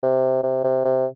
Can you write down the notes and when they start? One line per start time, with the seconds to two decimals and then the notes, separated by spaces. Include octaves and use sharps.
0.03 C3
0.43 C3
0.64 C3
0.85 C3